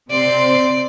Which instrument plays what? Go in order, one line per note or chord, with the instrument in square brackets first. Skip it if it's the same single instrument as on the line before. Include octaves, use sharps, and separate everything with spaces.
[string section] C3 C4 C6 [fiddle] D5